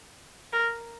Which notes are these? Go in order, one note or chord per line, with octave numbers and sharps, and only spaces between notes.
A#4